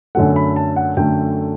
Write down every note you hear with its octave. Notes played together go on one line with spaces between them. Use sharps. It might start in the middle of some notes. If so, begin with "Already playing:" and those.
F#2 D3 F#3 A3 F#5
B5
A5
F#5
F#2 D3 F#3 A3 G5